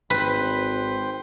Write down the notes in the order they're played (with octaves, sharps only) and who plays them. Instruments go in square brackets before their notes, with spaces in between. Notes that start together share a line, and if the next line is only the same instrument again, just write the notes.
[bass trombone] G#1 [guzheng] B4 [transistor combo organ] C5 G5